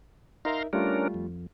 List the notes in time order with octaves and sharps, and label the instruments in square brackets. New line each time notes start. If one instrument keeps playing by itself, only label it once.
[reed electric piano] D#4 A#4 E5 [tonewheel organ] F5 A#5 C6
[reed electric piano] G3 A3 F4 [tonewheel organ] C#4 D4 A#4
[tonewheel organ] F2